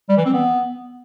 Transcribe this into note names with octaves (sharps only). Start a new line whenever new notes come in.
G3
E3
C4
B3